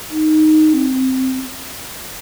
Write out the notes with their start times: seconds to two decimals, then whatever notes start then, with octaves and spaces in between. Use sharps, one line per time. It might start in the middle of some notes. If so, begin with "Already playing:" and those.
0.10 D#4
0.73 C4